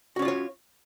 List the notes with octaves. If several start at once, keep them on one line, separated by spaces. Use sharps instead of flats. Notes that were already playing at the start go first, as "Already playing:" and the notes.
C#4 F4 F#4 C#5 D5